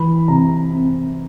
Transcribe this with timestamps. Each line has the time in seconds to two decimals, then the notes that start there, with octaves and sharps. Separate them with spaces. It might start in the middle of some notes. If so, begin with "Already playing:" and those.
Already playing: E3 B5
0.28 C3 A#5
0.74 C4